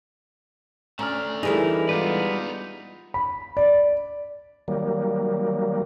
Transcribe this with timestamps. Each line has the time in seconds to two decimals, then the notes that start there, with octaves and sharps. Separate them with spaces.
0.99 A3 C#4 D5 A#5 F6
1.43 D3 E3 G3 D#4 E4 G#4 A#4
1.89 G3 G#3 B3 D#4 F4 B4 D5
3.14 B5
3.57 D5
4.68 D#3 F#3 G3 A#3